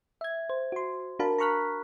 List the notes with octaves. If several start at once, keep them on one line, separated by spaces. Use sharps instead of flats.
E5 G#6
C5
F#4 C6
D4 F#4 A#4 F5 A5 B5
A#5 B5 C#6 F6 F#6 B6